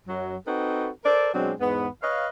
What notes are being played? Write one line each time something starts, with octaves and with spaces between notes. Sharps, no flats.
F#2 F#3
C4 D#4 F#4 A4 B4
A4 A#4 C5 D5
B2 F#3 G#3 C4 D4
E2 G#2 B3
B4 C#5 D#5 F5